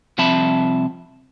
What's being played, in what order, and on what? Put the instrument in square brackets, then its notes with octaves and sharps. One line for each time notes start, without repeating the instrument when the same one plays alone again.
[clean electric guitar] C2 F3 C4 E5 A5 B5